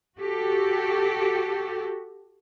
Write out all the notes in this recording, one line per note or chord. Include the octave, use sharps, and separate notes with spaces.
F#4 G4 A4